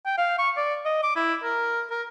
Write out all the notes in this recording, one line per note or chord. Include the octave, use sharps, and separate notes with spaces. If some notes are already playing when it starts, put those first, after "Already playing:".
G5
F5
C#6
D5
D#5
D6
E4
A#4
A#4